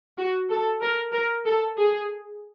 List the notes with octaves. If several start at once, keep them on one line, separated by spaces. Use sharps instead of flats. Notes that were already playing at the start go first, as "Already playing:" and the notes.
F#4
A4
A#4
A#4
A4
G#4